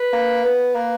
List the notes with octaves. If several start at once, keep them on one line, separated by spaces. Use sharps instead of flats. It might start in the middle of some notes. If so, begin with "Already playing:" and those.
Already playing: B4
A#3
B3
A#3 B4